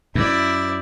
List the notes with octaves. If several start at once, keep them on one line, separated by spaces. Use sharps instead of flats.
F#2 E4 D5